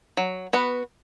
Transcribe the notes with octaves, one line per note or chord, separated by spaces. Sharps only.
F#3
B3 F#4 B4